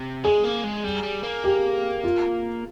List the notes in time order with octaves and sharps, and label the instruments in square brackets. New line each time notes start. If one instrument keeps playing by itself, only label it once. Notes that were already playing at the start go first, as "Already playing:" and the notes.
Already playing: [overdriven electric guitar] C3
[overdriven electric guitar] G#3 [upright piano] G#4
[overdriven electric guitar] A#3
G#3
G3
G3
A#3
[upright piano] G4
F4